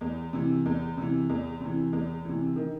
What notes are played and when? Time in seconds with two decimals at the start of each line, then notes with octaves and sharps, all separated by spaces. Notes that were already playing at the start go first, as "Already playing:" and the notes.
0.01 E2
0.33 C3 E3
0.66 E2
0.97 C3 E3
1.29 E2
1.60 C3
1.66 E3
1.93 E2
2.25 C3 E3
2.56 D#3